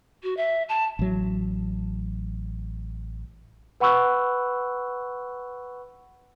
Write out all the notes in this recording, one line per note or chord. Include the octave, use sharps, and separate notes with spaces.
F#4
E5
A5
A1 F#3
B4 F#5 B5 C#6 E6 F#6